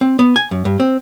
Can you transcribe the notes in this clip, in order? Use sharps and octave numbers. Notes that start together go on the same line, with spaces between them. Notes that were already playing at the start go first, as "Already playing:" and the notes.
C4
B3
G#5
F#2
G2
C4